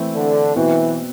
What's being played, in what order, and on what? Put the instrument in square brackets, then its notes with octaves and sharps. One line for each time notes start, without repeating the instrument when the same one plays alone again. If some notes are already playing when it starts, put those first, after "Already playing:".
Already playing: [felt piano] E3 A3 C4 E4
[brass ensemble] D3
[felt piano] B2 F#3 C4 F#4 [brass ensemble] E3